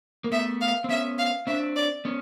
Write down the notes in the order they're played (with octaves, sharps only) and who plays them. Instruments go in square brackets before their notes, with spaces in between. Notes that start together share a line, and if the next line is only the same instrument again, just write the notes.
[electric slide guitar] A#3
[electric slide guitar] A3 B3 [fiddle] E5
[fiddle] F5
[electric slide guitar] C4
[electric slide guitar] B3 C#4 [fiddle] E5
[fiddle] F5
[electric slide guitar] C4 D4 [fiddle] E5
[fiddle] D5
[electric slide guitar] B3 C#4